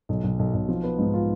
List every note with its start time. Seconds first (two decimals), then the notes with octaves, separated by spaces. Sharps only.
0.09 B1
0.24 B1
0.39 B1
0.54 B1
0.69 F3
0.84 B3
0.98 G#2
1.14 F4